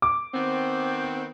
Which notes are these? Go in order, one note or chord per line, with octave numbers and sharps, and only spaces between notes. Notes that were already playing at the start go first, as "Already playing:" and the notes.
D6
D#3 B3 C4